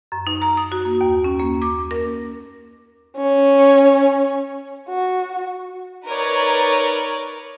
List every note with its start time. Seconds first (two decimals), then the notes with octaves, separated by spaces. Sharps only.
0.12 F#2
0.27 D#4
0.42 A#5
0.57 D#6
0.72 F#4
0.85 A#3
1.01 D#2
1.24 C#4
1.39 A#3
1.62 D6
1.91 A#4
3.17 C#4
4.89 F#4
6.06 D#4 A#4 B4 C#5 D5